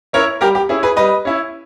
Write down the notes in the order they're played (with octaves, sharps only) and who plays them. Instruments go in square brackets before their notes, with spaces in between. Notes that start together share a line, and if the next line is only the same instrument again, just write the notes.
[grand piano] C#4 E4 A#4 C#5
G3 G4 A#4
G4
C#4 E4 G#4
G#4 B4
G3 B4 D#5
C#4 E4